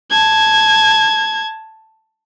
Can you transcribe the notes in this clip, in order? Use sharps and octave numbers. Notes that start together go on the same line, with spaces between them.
A5 G#6